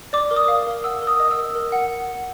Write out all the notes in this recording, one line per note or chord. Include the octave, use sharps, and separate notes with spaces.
D5 D6
A#4
D#6
F5
A#4
F#5 E6
A#4
D#6
D#5 D#6
E6
A#4
A#4
F#5